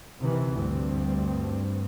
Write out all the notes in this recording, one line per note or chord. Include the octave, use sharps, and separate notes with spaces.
C3 D#3 E3
D2 G2 C4